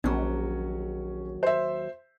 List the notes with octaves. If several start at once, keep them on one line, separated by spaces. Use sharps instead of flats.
A#1 D#2 F#3 C#4
C5 E5